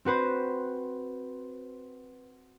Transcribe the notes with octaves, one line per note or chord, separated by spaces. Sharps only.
C4 F#4 B4 C5